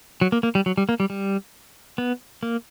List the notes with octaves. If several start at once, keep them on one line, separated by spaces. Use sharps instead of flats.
F#3
A#3
A#3
G3
F#3
G3
A#3
G3
G3
B3
A#3